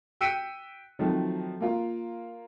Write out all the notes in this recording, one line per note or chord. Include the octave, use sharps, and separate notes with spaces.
G5 E6 B6 C#7 D#7
D#3 F3 F#3 A3 C4
A#3 F4